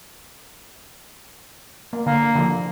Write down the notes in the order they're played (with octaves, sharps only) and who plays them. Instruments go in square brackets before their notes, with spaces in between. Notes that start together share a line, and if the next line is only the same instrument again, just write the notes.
[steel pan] A#3
[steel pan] D3 [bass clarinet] A#3
[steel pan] D3 F3